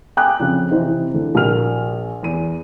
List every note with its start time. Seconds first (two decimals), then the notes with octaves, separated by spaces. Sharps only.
0.17 G5 G#5 D6 D#6 F#6
0.39 F2 C#3 F3
0.71 C3 E3 C4 D#4
1.14 D3 E3
1.35 A#1 F#4 A#4 F6 F7
2.23 E2 D#7